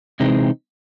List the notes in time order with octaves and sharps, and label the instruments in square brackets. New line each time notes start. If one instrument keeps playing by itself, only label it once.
[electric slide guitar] C3 E3 G#3 C4 D#4